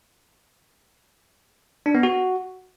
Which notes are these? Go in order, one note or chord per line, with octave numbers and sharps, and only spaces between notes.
D4
B3
F#4